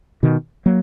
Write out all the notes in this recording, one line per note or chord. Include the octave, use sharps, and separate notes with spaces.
B2 D#3
F#3 A#3